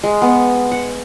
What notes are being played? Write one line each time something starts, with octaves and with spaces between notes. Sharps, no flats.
G#3
B3
F#5